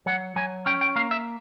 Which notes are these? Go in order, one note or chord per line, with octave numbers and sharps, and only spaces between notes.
F#3 F#5
F#3 G#5
C#4 G5
G5
A#3 F5
E5